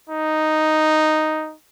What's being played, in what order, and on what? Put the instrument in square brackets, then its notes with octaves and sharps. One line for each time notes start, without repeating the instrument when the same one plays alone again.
[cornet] D#4